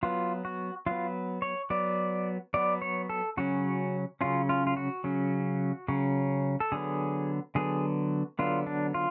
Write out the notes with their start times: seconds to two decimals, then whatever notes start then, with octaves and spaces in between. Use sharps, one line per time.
0.03 F#3 B3 F4
0.45 F#4
0.86 F#3 B3 F4
1.42 C#5
1.70 F#3 B3 D5
2.54 F#3 B3 D5
2.82 C#5
3.09 A4
3.37 C#3 F#3 C#4 F#4
4.21 C#3 F#3 C#4 F4
4.49 F4
4.67 F4
4.77 F#4
5.04 C#3 F#3 C#4
5.88 C#3 F#3 C#4
6.60 A4
6.72 D3 F#3 B3 G#4
7.55 D3 F#3 B3 G#4
8.39 D3 F#3 B3 F4
8.66 D4
8.94 F4